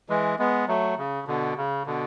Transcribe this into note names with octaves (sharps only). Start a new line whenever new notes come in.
E3 G#3
G#3 B3
F#3 A3
C#3
B2 D3
C#3
B2 D3